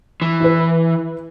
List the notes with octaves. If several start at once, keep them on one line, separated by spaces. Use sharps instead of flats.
E3
E4 B4